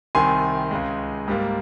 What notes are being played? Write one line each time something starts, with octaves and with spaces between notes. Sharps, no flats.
C2 C3 D#3 G#5 C6
C#2 C#3 G#3
G#2 G3 A#3